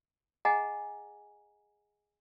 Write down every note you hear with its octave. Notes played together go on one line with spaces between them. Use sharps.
G#4 D#5 F#5 G#5 A#5